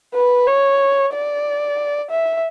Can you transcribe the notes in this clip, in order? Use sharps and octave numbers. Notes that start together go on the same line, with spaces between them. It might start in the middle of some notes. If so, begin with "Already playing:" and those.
B4
C#5
D5
E5